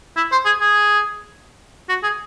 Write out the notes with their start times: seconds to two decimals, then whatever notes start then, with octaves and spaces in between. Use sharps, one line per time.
0.17 E4
0.32 C5
0.45 G#4
0.60 G#4
1.89 F#4
2.03 G#4